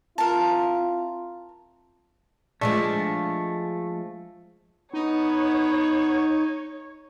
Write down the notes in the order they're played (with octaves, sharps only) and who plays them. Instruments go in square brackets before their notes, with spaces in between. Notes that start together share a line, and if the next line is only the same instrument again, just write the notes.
[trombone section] C4 E4 F4 [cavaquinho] A#4 A5
[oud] F3 G#3 D4 [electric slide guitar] A3
[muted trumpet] B3 [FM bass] D#4 [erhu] C#5